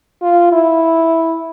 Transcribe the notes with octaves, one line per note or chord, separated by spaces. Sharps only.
F4
E4